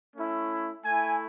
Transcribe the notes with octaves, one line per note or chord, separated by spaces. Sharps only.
A3 C#4 E4
A3 E4 G#5